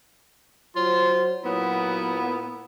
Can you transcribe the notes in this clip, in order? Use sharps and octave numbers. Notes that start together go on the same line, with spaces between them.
F#3 F4 C5
A#2 F#3 B3 E4